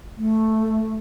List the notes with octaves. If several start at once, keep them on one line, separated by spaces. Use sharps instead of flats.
A3